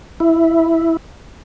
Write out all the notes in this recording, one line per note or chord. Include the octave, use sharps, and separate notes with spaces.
E4